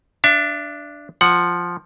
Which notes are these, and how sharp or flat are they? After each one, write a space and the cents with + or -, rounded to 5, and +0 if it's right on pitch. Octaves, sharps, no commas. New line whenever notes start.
D4 +0 E5 +40
F3 +0 F#5 +0